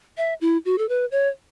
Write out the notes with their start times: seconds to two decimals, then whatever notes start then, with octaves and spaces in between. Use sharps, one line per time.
0.17 E5
0.41 E4
0.65 F#4
0.78 A4
0.89 B4
1.11 C#5